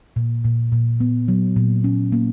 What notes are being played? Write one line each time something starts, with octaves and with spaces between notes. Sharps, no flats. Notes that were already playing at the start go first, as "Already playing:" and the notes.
A#2
A#2
A#2
B3
F#3
A#2
C#4
A#3